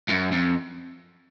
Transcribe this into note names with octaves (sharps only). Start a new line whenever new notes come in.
F#2
F2